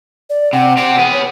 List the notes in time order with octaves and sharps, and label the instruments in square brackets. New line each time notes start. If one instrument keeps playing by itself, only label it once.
[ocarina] D5
[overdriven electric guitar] C3 [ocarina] F#5
[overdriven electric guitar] C4 G4 [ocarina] F#5
[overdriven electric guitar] B3 G#4
[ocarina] C#5